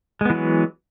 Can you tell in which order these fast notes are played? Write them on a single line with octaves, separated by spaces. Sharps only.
G#3 B3 E3 F#3